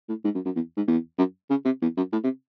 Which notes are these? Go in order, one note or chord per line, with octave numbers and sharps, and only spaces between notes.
A2
G#2
F#2
F#2
E2
G#2
E2
F#2
C#3
C3
E2
F#2
A2
C3